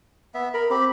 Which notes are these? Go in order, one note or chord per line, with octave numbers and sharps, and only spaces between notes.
B3 E5
A#4 B5
C4 G4 B5